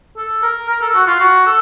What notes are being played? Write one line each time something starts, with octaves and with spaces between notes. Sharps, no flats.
A4
A#4
A#4
A4
F#4
F4
F#4
A4